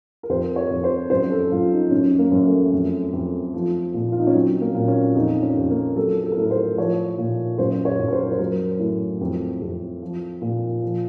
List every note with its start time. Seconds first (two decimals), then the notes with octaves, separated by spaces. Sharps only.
0.23 A#4
0.29 F2 C5
0.56 C#5
0.70 F2
0.84 C5
1.10 F#2 C5
1.31 A4
1.52 F#2 F4
1.72 D#4
1.91 F#2 C#4
2.19 A#3
2.31 F#2
2.46 A3
2.73 F2
3.13 F2
3.54 F3
3.94 A#2
4.12 F4
4.20 D#4
4.27 C#4
4.35 F#3 C4
4.61 A#3
4.75 A#2
4.88 C#4
5.15 F2 D#4
5.43 C#4
5.56 F2
5.70 A#3
5.96 F#3 A4
6.23 A4
6.32 A#4
6.37 A2 A4
6.51 C5
6.77 F3 C#5
7.18 A#2
7.58 F#2 C5
7.85 C#5
7.99 F#2
8.08 A#4
8.13 C5
8.32 C5
8.39 F#3 A#4
8.79 A2
9.21 F2
9.62 F2
10.02 F3
10.42 A#2
10.82 F3